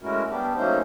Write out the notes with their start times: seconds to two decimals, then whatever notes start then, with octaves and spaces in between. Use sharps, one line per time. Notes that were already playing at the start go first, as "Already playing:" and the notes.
0.02 G#3 A3 C#4 E4 F#4 A#4
0.30 G3 B3 D4 G4
0.56 F#3 A3 A#3 C#4 D#4 C5